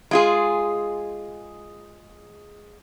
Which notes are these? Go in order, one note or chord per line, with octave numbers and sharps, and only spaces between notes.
G#3 F4 G#4